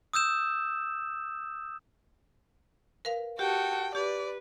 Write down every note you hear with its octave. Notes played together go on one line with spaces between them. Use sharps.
D#6 E6 G6 E7
A#4 B4 F5
F#4 G4 A4 G5
G4 B4 D5